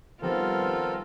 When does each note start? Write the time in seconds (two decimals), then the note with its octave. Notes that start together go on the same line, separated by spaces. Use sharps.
0.22 D#3 F3 G3 B3 C4 F4 A4 A#4